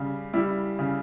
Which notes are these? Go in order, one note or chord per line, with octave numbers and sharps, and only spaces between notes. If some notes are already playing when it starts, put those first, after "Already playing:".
Already playing: C#3 G3
G3 E4
C#3